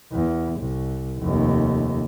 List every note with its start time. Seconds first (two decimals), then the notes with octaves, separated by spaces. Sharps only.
0.12 E2
0.59 C2
1.19 F1 D#2